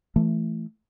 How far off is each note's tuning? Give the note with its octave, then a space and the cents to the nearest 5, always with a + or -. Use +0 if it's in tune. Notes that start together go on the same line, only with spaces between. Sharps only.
E3 +15 A3 +0